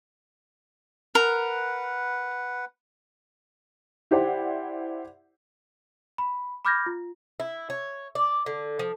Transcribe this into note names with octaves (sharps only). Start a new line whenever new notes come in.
A#4 B4 F#5
E4 G4 C5 D5 F#5
B5
B5 D6 F6 G6 G#6 A#6
F4
E4
C#5
D5
D3
F3